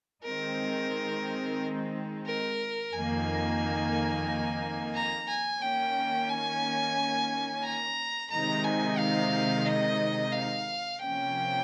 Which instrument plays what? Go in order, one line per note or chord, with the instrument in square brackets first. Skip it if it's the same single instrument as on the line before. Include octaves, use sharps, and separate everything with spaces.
[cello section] D#3 G#3 C4 D#4 [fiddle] A#4
[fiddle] A#4
[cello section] F2 D#3 A#3 D#4 [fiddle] G#5
[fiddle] A#5
G#5
[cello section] D#3 A#3 C#4 [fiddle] G5
[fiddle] G#5
A#5
[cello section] C3 D#3 G#3 D#4 [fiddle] A#5
[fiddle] G#5
F5
D#5
F5
[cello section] C3 F3 A#3 C#4 [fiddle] G5